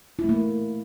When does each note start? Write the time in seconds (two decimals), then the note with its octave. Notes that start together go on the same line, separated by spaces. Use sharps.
0.19 E4
0.24 A3
0.29 A#3